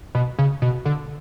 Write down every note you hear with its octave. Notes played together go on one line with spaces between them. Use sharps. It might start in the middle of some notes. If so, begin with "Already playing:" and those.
B2
C#3
B2
D3